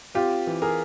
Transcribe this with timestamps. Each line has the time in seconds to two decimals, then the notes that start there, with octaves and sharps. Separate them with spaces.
0.15 C4 F4 G4
0.47 E3
0.62 G#4 A#4